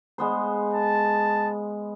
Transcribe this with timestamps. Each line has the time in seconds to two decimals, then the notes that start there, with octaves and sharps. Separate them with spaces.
0.18 G#3 B3 C5
0.73 A5